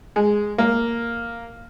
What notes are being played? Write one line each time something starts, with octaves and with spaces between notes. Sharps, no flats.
G#3
A#3